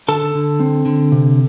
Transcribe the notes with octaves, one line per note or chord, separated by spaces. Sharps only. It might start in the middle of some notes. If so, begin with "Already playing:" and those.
D3 A4 A5
D3
C4
D3
C3